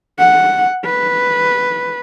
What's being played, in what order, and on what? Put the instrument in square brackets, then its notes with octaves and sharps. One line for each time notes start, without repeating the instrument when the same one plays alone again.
[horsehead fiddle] F#5
B4